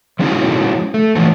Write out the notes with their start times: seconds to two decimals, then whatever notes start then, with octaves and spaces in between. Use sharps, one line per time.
0.19 F3 G#3 C#4 D#4 E4 F#4
0.94 A3
1.15 E3 F3 A3